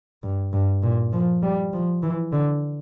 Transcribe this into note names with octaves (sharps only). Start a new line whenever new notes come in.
G2
G2
A#2
F3
G3
F3
E3
D3